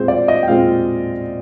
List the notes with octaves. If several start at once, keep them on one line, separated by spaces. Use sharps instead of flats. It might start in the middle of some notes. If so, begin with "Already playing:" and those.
Already playing: A#2 G#3 C4 G#4 C5
D5
D#5
G5
A#2 G#3 C4 F5